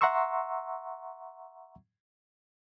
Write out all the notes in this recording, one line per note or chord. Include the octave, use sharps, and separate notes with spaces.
E5 F#5 A#5 C6 C#6 E6